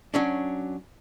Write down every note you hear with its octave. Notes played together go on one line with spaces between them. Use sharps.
F#3 C#4 D4